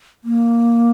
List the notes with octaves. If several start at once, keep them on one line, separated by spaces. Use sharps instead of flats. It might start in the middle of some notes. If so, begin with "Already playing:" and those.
A#3